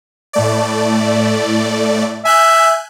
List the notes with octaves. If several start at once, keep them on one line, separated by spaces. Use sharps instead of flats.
A2 A3 D5
E5 G#5 F#6 G6